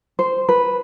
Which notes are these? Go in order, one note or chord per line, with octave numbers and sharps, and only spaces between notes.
C5
B4